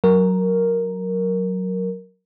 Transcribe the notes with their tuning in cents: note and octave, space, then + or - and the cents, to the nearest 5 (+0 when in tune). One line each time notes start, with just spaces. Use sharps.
F#3 +0 A#4 +0